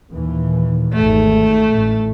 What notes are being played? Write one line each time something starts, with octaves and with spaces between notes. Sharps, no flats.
D#2 A#2 E3
G#1 E2 A3
A1